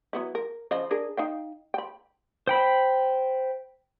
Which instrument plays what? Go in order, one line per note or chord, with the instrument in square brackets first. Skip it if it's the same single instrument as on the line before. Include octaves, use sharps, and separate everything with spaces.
[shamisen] F#3 B3 E4
A#4
C#3 F3 D#5
D4 G#4 A#4
D#4 F5 G5
G5 B5
[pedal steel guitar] C5 G5 B5